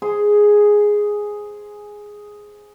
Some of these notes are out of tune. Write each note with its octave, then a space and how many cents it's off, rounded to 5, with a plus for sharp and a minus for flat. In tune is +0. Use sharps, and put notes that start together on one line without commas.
G#4 +0 C5 +0